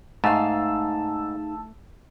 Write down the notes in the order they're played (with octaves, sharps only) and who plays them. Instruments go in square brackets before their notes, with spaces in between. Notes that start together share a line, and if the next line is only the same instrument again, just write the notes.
[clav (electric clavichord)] G#2 [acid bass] A3 [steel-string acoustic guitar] D#4 G#4 F5 [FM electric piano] A5 E6